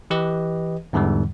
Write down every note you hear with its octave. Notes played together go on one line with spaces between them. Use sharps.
E3 G4 B4 D#5
E2 G#2 D3 E3 G3